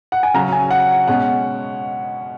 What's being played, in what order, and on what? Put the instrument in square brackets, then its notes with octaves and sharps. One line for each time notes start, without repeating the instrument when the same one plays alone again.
[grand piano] F#5
G#5
[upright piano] C#3 F#3 C#4 [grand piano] A#5
[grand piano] G#5
F#5
[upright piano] B2 G#3 C#4 [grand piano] F#5